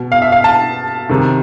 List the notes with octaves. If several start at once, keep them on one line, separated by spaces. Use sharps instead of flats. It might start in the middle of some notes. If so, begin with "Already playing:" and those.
Already playing: B2
F5
E5
F5
A5
C3 D#3